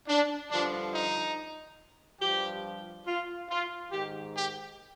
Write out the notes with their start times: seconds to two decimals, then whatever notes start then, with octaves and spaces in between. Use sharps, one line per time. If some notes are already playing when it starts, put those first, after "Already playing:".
0.08 D4
0.50 G2 D3 F3 D4
0.93 D#4
2.22 G2 F3 G4
3.06 F4
3.50 F4
3.91 G#2 D#3 G4
4.35 G4